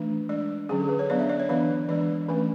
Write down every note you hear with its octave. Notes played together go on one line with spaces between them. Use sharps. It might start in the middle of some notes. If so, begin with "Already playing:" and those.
Already playing: E3 A3 D4
G#3 D4 D5
D3 F#3 C#4 G#4
A4
B4
C#5
F#3 B3 D4 D5
E5
D5
C#5
E3 B3 D4 D5
E3 G#3 D4 D5
E3 A3 C#4 B4